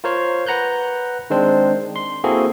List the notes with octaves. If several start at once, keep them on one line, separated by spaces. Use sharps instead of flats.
F4 A#4 C5 C#5 F5
B4 F#5 A#5 F#6 G6
D#3 G#3 C4 D4 C5
C6
A#3 C4 E4 F#4 G#4 A4